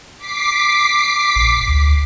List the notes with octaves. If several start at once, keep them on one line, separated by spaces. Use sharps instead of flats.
D6 B6 C7
A#1
D2